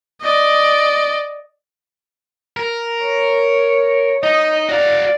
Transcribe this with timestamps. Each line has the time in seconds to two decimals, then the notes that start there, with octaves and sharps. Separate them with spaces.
0.21 D5 D#5
2.57 A#4
3.03 C#5
4.23 D#4 D#5
4.69 F#4 D5 F5